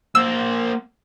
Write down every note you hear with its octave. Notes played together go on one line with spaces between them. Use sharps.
A#3 C5 E6